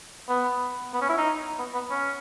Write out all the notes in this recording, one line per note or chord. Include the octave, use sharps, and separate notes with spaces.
B3
B3
C#4
E4
D#4
B3
B3
C#4